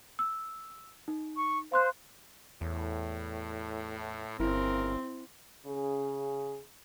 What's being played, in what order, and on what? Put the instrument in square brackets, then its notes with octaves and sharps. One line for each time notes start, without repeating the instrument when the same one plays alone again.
[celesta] E6
D#4
[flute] C#6
[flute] C5 [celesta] F5 C6 F#6
[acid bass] E2 [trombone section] A2
[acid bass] G1 [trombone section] D#2 C#3 A#4 [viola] C4 [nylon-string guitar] E4
[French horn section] C#3 G#4